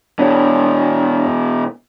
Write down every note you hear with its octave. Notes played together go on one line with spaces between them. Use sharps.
B2 E3 D4 C#5 D5